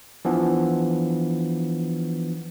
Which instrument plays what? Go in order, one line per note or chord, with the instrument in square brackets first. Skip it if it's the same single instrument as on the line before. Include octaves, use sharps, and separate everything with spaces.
[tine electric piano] E3 F3 B3 D4